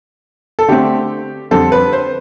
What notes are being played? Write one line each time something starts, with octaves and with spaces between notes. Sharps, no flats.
A4
D3 A3 C4 G4
F2 D3 G3 C4 A4
B4
C5